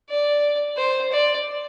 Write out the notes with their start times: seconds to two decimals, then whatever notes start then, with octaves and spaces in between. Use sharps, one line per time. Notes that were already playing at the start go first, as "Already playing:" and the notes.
0.09 D5
0.77 C5
1.12 D5